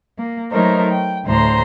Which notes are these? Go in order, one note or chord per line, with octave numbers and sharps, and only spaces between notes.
A#3
F#3 A3 D#4 A#4 C5 C#5
G5
D2 A2 C5 A#5 C6